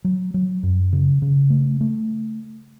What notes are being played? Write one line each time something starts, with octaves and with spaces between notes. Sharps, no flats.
F#3
F#3
F#2
C#3
C#3
A3
A3